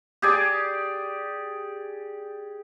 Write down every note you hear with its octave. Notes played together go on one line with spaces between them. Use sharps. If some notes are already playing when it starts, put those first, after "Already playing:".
G4 G#4 D5